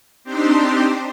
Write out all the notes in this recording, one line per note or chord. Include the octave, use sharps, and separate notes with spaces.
C4 D4 D#4 G4 C5